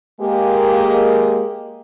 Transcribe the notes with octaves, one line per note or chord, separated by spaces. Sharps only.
G#3 A#3 G4